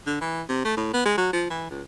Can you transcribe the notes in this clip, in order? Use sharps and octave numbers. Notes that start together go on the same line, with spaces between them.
D3
E3
C3
A3
A2
B3
G#3
F#3
F3
E3
C#2